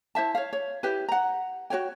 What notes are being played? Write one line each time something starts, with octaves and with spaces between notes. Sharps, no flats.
E4 C5 E5 A5
C#5 F5
C#5
E4 G4 B4
F#5 A#5
F#4 B4 C#5 G5